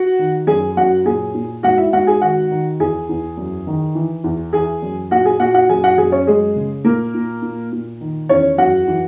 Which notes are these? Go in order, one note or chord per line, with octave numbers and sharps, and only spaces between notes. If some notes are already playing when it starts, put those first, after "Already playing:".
Already playing: F#4 F#5
D#3
F#2 G#4 G#5
F#2 F#4 F#5
A#2 G#4 G#5
A#2
G#2 F#4 F#5
E4 E5
G#2 F#4 F#5
G#4 G#5
D#3 F#4 F#5
D#3
E2 G#4 G#5
E2
F#2
D#3
E3
E2
E3 G#4 G#5
F#2
A#2 F#4 F#5
G#4 G#5
A#2 F#4 F#5
F#4 F#5
F#2 G#4 G#5
F#4 F#5
F#2 G#4 G#5
C#4 C#5
F#2 G#3 G#4
C#3
A#2 A#3 A#4
A#2
A#2
A#2
D#3
E2 C#4 C#5
F#2 F#4 F#5
E3